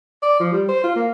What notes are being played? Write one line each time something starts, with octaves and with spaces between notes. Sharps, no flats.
D5
F3
G3
C5
F4
A#3